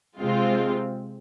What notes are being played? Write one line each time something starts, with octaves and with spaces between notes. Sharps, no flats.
C3 G#3 C4 F4